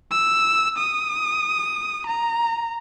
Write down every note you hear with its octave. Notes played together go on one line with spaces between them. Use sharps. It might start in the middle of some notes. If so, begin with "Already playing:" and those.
E6
D#6
A#5